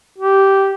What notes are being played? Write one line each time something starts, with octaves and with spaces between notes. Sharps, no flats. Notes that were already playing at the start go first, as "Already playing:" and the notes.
G4